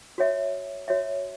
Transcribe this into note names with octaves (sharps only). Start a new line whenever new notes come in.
F#4 C#5 E5
F#4 C#5 E5